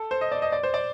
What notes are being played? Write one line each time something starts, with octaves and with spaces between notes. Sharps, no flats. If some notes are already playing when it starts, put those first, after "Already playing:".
Already playing: A4
C5
D#5
D5
D#5
D5
C5
D5